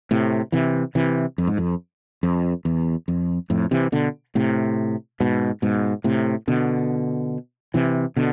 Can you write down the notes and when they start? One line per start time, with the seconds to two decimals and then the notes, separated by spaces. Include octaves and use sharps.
0.11 A2 C3
0.52 C3 E3
0.95 C3 E3
1.38 F2
1.47 G#2
1.58 F2
2.23 F2
2.65 E2
3.08 F2
3.50 F2 A2
3.71 C3 E3
3.92 B2 D3
4.35 A2 C3
5.20 G#2 B2
5.62 G#2 B2
6.04 A2 C3
6.48 B2 D3
7.74 C3 E3
8.16 B2 D3